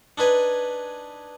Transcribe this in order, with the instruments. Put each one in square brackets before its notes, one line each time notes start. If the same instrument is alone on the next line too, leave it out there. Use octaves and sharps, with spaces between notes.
[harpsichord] D4 D#4 B4 G#5